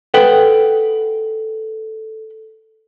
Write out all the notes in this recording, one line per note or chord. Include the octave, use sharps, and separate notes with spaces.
A4 B4 F#5 G5